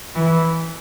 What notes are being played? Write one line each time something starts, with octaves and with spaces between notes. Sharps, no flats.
E3